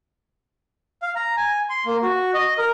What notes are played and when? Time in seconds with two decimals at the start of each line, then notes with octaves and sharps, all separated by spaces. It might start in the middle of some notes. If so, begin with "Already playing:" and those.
1.02 F5
1.16 A#5
1.37 G#5
1.70 C6
1.86 A#3
2.03 F#4
2.34 D#5
2.58 A#4